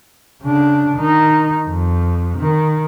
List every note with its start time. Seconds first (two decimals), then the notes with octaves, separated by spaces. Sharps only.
0.42 C#3 D4
0.97 D#3 D#4
1.68 F2
2.38 D#3